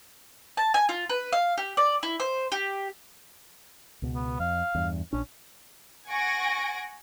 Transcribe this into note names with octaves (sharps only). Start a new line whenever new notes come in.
A5
G#5
F4
B4
F5
G4
D5
E4
C5
G4
C#2 B2
B3
F2 F5
E2 G2
A#1 C#4 D4
F#5 G#5 C#6 G#6 A#6 D7